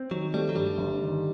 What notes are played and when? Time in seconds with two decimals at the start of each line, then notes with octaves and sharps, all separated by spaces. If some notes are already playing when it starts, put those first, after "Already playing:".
Already playing: C4
0.11 D#3 F#3
0.34 G3 A3
0.49 F#3
0.56 G2 G3
0.78 G1
1.01 D#3